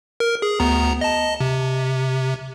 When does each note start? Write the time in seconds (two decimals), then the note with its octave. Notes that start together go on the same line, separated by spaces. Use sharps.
0.20 A#4
0.42 G#4
0.60 D2 B3 A#5
1.01 D#5 A5
1.40 C3